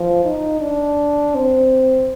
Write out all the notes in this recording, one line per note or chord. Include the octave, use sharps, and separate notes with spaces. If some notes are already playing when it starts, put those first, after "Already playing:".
Already playing: F3
D#4
D4
C4